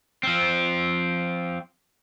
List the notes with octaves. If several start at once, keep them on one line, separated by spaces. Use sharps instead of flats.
F3 C4